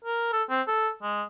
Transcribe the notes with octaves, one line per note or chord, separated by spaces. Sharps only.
A#4
A4
C4
A4
G#3